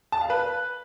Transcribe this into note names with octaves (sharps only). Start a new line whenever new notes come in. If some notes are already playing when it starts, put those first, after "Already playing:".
A5
F5
B4